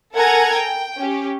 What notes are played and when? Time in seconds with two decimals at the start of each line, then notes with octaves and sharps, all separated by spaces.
0.13 A4 A#4 F#5 G#5 A#5 G#6
0.54 G5
0.98 C#4 G4